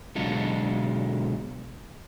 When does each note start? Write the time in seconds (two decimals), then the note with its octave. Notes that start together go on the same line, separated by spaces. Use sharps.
0.16 B2 D3 F#3 G#3 F4 A4